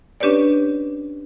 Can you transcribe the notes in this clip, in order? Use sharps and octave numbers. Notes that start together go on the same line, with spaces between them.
C#4 D4 G4 B4 C#5 D5